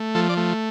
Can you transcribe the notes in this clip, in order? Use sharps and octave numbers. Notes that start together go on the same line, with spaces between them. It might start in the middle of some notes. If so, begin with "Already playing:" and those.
Already playing: A3
F3 A4
D5
A3